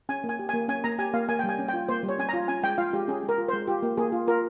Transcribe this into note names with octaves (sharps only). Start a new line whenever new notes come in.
C#4 G#5
A#3
G#5
G4
G#5
A#3
C#4 G#5
A#3 A#5
G4 G#5
A#3 F5
A#3 G#5
G3 G5
G#5
C#4
G5
F4
A#3 C5
G3
C#5
C#4 G#5
A#5
F4
C#4 G#5
G#3 G5
F4 F5
G#3 G4
C#4 G#4
G#3
A#4
F4
C5
G#3
F4 G4
A#3
A#3 G#4
F4
F4 A#4